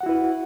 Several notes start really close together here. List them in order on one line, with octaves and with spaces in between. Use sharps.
F#5 F#4 E4 B4